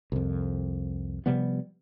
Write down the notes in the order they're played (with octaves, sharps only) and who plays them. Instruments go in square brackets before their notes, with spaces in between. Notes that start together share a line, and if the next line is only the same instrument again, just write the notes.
[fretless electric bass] C2 F2
C3 F3 G3 B3